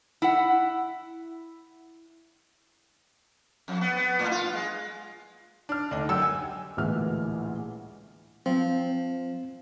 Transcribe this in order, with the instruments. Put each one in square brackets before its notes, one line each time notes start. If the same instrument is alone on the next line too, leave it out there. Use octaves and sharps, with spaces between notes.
[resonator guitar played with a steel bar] E4 F#5
[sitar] F2
B3
B3
A2
F4
G#3
[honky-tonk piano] D4 F6
[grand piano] D2 [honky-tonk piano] D4 D#4
[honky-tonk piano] F#2 G4 F#5 [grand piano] E6
[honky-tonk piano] G#5
[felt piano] A1 D2 A#2 E3 G#3 F6
[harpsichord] F3 [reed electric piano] C4